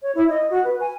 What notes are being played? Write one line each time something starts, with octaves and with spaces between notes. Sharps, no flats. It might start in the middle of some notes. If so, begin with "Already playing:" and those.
C#5
E4
D#5
F#4
B4
G#5